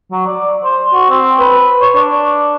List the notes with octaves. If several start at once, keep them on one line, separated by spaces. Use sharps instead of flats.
F#3
D5
C5
F#4
C4
B4
C#5
D4